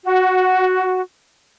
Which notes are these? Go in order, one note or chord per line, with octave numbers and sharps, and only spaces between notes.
F#4